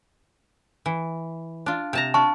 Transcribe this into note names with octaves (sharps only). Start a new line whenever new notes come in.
E3
D4 F4
C3 A5 A#5
D4 F4 A5 C#6